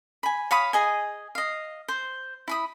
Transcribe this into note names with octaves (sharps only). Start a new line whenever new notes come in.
G#5 B5
C#5 F5 B5 D#6
G#4 D#5 G#5
D#5 F5
C5
E4 B5 D#6